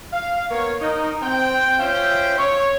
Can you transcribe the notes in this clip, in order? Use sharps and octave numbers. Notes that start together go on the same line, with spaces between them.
F5
A#3 B3 C#5
D#4 A#4
C4 G5
C#4 F4 C5 E5 G5
C#5